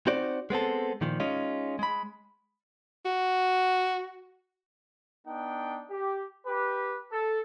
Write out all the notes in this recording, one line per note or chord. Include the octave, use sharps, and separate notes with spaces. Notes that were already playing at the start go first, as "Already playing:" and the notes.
C4 D#4 F#4 C5 D5
G#3 B3 C4 A4
A#2 D#3 F3
G#3 C#4 D#4 F4
G#3 B5
F#4
B3 D4 D#4 G5
G4
G4 B4
A4